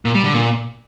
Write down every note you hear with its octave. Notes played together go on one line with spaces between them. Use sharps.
A#2
G3
D3
A#2